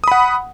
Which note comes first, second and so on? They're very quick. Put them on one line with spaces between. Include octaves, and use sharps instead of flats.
D#6 B5 F#5